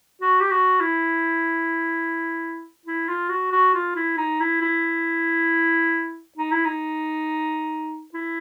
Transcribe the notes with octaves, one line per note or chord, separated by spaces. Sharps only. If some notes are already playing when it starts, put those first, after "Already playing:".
F#4
G4
F#4
E4
E4
F4
F#4
F#4
F4
E4
D#4
E4
E4
D#4
E4
D#4
E4